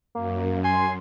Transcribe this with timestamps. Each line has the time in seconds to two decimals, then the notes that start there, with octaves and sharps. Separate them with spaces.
0.15 F#2 A#3
0.64 G#5 C6